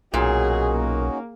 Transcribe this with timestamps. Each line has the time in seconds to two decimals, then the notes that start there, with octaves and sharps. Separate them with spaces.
0.14 B1 A#2 C#4 D#4 F#4 G#4
0.71 A#3